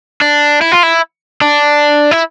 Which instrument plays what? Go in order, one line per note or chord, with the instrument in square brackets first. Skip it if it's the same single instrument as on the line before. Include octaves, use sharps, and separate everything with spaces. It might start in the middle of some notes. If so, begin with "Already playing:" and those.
[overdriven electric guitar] D4
E4
F4
E4
D4
E4